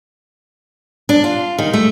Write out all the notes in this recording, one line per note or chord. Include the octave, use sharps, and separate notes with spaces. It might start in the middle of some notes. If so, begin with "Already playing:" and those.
D4
F4
D#3
A3